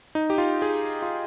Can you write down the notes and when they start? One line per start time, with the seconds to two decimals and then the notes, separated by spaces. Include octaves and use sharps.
0.15 D#4
0.30 G4
0.38 F4
0.62 G#4
1.02 F4